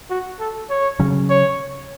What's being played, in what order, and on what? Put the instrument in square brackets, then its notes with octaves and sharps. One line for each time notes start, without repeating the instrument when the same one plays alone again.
[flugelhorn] F#4
A4
C#5
[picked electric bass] C#3 F#3 C#4
[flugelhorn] C#5